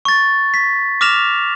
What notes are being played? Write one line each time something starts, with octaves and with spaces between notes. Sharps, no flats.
C#6 A6
B6
D6 F6 A#6 E7 F7